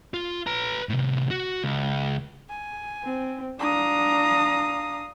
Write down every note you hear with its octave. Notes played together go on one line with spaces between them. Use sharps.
F4
B4 A#5
A2 C3
F#4
C#2
G#5
C4
D4 F5 A#5 D#6